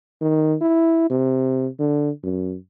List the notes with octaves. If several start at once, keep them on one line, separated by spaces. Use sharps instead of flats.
D#3
E4
C3
D3
F#2